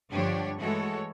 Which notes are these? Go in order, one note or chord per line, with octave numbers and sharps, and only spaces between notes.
G2 D3 F3 D4 G4 C#5
E3 G#3 A3 F#4 A4 C#5